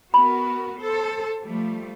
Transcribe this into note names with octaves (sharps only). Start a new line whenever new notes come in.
B3 F#4 A#4 B5
A4 C5
F3 G3 A3